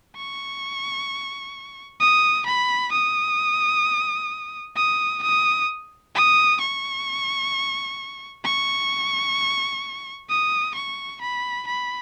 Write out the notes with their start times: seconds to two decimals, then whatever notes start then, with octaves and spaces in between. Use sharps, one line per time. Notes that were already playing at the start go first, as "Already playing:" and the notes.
0.16 C#6
2.00 D#6
2.46 B5
2.92 D#6
4.76 D#6
5.22 D#6
6.15 D#6
6.61 C#6
8.44 C#6
10.29 D#6
10.75 C#6
11.21 B5
11.67 B5